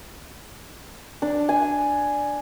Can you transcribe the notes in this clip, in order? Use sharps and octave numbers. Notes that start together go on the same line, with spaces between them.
D4
G#5